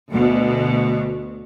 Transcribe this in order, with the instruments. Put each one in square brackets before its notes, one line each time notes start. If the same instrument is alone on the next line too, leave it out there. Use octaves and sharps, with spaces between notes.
[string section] D2 B2